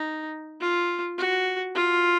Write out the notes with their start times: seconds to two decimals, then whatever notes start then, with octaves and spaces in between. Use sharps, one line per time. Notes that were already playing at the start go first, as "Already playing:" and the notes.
Already playing: D#4
0.61 F4
1.18 F#4
1.75 F4